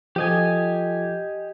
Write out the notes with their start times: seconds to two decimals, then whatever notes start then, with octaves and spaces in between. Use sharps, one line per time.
0.16 F3 F4 G4 A4 D#5 G#5